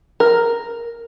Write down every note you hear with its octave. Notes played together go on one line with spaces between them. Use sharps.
A#4